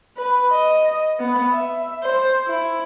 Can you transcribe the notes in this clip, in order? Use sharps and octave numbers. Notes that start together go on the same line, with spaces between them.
B4
D#5
B3
E5
C5
E4